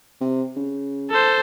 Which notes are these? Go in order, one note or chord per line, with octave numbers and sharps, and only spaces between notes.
C3
C#3
A4 C5